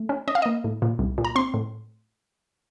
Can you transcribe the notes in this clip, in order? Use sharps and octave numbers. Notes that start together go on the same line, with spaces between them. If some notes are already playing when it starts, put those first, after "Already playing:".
Already playing: A3
C#4
C#4 D#5
F5
A#3 D#5
A2
A#2
C2
A#2
A#5
C4 C6
A2